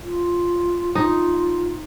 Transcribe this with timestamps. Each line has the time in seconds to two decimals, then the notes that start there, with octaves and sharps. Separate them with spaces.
0.04 F4
0.95 D#4 F4